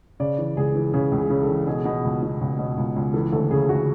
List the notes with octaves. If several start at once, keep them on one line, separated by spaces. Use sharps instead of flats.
C#3 D5
E3
C#2 G#4
E3
C#3 G#4
C#2
G#4
C#3
A4
E3
B2 G#4
B2
C#2
B2
C#2
B2
C#2
C#2
E3 A4
D2 A4
C#3 G#4
D2 F#4